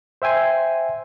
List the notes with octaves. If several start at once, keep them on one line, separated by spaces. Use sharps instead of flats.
C5 E5 G5 G#5 C6